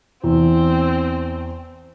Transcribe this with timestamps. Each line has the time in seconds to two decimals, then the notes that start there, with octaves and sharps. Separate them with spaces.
0.24 E2 C4